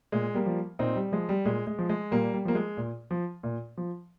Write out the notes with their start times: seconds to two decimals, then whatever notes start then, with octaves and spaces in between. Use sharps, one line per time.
0.12 A#2 G#3
0.34 G3 A#3
0.46 F3
0.79 A#2 C4 D#4
0.96 G3
1.12 F3 G#3
1.29 G3
1.45 A#2 G#3
1.67 G#3
1.79 F3
1.89 G#3
2.11 A#2 G3 A#3
2.33 G3
2.45 F3 A#3
2.55 G#3
2.77 A#2
3.11 F3
3.43 A#2
3.77 F3